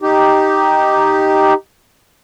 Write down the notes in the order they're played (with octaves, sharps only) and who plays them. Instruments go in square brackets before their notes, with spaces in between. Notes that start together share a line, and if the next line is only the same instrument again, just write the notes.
[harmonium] D#4 G4